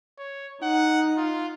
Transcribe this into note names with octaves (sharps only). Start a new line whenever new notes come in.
C#5
D#4 F#5
F4